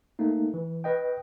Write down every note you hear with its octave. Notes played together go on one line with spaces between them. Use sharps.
A3 A#3 D#4
E3
B4 D#5 G5